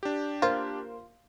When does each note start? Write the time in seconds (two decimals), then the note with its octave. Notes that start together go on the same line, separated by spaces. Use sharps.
0.03 D4 G4
0.42 A#3 F4 A#4 C5